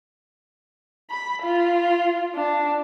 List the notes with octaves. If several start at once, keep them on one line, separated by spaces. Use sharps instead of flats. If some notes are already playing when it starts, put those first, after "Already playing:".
B5
F4
D4